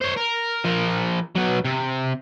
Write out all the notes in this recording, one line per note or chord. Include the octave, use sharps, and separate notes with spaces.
C5 C#5
A#4
F3 A#4
F#3 B3
C3